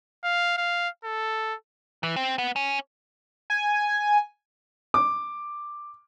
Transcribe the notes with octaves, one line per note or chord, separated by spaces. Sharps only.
F5
F5
A4
E3
C4
B3
C#4
G#5
D6